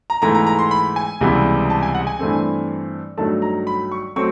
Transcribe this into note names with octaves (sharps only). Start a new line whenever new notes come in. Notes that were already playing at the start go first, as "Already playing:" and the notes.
A#5
G#2 E3 A3 A#5
A#5
A#5
C6
B5
G#5
C#2 C3 E3 G3 B3
A5
G#5
F#5
G#5
G2 E3 A3 C4
G2 D#3 F#3 A3 A5
A#5
B5
C#6
F#3 A3 C4 C#6